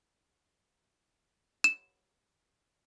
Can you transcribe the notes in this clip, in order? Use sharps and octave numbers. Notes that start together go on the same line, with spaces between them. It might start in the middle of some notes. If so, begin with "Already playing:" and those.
E7